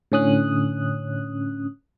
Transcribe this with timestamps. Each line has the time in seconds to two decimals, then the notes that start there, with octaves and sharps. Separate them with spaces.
0.12 A2 D3 C#4 D#6 F#6